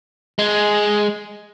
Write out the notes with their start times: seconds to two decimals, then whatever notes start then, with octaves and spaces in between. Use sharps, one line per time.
0.39 G#3